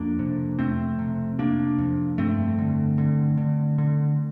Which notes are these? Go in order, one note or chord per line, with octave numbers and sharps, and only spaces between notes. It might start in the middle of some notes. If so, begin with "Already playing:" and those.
Already playing: F2 A#3 D4
C3
F2 A3 C4
C3
C3 A#3 D4
F2
G2 A3 C4
D3
D3
D3
D3